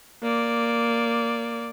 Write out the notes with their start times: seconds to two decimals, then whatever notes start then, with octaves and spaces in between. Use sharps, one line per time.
0.23 A#3 D5